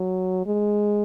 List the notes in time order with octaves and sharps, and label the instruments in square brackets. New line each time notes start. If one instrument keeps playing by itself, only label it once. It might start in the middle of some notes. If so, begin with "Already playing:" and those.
Already playing: [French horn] F#3
G#3